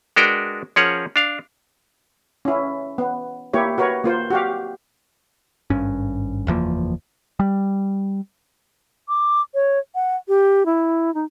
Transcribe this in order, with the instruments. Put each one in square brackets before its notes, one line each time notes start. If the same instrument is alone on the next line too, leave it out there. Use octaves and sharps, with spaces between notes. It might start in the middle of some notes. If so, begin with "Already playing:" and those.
[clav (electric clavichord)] G#3 D4 F#4 A#4 B4 G5
F3 C#4 G#4 A#4 C#5 F#5
D4 F5
[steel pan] C#4 E4
B3
A#3 E4 G4 C#5
F#4 A#4 B4 C#5
A#3 F4 C5
F#4 G4 F5
[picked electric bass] G#1 G2 C#4
F#1 E2 F3 A#3
G3
[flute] D6
C#5
F#5
G4
E4
D#4